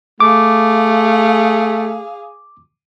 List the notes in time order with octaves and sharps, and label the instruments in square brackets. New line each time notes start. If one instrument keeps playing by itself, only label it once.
[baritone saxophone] A3 [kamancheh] G#4 F5 [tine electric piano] D6